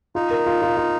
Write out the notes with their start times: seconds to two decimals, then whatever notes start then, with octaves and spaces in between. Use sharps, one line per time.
0.15 D#4 F4
0.30 A#4
0.46 F4
0.62 F4
0.77 F4